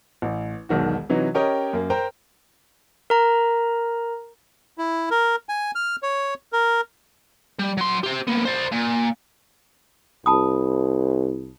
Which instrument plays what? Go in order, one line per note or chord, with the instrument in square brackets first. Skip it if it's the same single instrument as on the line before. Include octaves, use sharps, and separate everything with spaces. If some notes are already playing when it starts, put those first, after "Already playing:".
[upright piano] A1
E1 B1 D#3 F#4
C3 E3 F#3 D#4
C#4 G4 A#4 C#5 D#5 G5
F#2 A#3
A#4 C5 G5 A#5
[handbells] A#4 A#5
[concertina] E4
A#4
G#5
F6
C#5
A#4
[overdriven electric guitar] G3
F#3 C6
G4 C5
A#3 B3
C5 D5
A#2
[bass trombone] C2 [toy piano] A5 B5 D#6